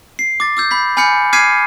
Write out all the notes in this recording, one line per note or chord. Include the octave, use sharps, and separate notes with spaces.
C7
D6 A6
D6 E6 G6
B5 G6 B6
G#5 B5 F6 G6 C#7
D6 F6 G#6 B6 C7 D#7